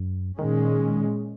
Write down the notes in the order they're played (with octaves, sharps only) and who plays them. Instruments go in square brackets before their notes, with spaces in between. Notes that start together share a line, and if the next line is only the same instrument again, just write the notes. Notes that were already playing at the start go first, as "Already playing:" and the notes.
Already playing: [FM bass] F#2
[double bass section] A#2 G#3 C#4 [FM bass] D#3